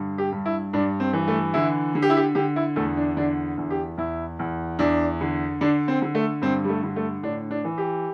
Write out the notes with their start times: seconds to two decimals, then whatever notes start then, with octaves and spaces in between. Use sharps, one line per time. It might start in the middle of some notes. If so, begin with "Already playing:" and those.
Already playing: G2 D3
0.18 G4
0.32 G2
0.45 E4
0.73 G2 D4
1.00 C4
1.13 E3
1.28 A3
1.54 D3 E4
1.95 D3
2.02 G4
2.10 E4
2.17 G4
2.35 D3 G4
2.56 E4
2.76 E2 A3
2.97 D4
3.17 D3 D4
3.58 E2
3.70 G4
3.97 E2 E4
4.39 E2
4.79 E2 D4
5.21 D3
5.61 D3 D4
5.88 C4
6.02 D3
6.15 A3
6.42 G2 C4
6.64 G3
6.69 A3
6.83 D3
6.96 A3
7.23 A2 D4
7.51 D4
7.65 E3
7.78 G4